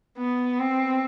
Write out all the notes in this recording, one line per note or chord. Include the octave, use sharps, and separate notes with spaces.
B3
C4